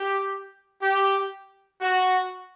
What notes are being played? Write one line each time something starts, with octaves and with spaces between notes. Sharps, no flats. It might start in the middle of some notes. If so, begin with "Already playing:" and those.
Already playing: G4
G4
F#4